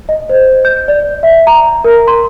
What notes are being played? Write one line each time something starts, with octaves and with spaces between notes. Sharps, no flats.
D#5
C5
G6
D5
E5
A#5
A#4
C6